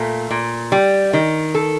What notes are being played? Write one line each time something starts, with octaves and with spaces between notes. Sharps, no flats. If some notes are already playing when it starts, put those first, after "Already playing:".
Already playing: A#2 A3
A#2
G3
D#3
A4